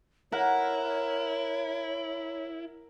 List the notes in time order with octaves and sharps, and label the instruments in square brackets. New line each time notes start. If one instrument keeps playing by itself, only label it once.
[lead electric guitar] E4 [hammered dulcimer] A#4 F#5 [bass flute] C#5